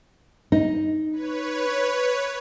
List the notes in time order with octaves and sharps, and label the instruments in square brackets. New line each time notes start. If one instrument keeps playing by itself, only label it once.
[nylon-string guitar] D#4
[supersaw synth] B4 C#5